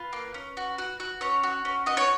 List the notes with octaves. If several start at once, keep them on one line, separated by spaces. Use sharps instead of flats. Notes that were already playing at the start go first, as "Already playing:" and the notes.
Already playing: F4 B4
A#3
C#4
F#4
F#4
F#4
C#4 C#5
F#4
C#4
F#4 D#5
C#5